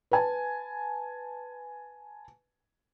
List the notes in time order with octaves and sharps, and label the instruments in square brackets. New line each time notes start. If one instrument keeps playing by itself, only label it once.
[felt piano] B4 G#5 A5